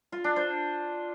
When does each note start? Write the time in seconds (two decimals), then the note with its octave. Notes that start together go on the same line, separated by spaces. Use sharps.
0.12 F4
0.24 D4
0.36 C5